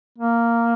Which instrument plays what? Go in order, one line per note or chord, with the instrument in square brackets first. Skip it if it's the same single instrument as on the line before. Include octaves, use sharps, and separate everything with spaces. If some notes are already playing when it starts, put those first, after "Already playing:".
[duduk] A#3